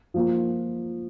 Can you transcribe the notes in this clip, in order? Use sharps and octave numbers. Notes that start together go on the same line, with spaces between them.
F3 A#3 F4